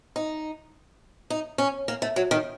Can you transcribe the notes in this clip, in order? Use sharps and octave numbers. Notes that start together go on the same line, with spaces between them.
D#4
D#4
C#4
A#3
A3
F#3
D#3